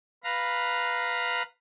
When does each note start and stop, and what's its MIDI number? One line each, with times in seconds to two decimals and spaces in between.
0.24 1.42 71
0.24 1.42 77
0.24 1.42 82